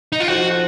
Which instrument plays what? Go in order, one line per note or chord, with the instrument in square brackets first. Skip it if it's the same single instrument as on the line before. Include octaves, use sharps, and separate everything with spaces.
[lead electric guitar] D#4
F4
[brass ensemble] F3 C4 D#4 A4 C5 [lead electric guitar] F#4